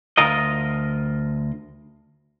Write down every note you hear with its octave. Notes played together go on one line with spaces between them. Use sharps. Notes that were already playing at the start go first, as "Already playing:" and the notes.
D2 F4 A#4 D#5